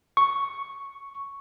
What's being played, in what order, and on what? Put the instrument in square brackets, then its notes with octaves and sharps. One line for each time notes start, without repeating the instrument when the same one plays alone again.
[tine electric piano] C#6